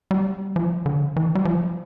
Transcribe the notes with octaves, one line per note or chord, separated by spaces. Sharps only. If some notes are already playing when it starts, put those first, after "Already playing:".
G3
F3
D3
E3
G3
F3